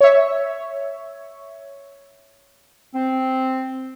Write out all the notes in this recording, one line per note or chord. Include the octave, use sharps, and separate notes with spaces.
C#5 E5
C4